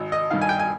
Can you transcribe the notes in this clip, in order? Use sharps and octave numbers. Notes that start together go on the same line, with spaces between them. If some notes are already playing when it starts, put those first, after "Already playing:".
Already playing: G#1
D#5
G2 D#3 F5
G#5
G5
G#5